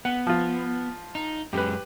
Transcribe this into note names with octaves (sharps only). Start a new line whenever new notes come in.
B3 F#5
F3 F4
D#4
F#2 G#3 C#4 G4 B4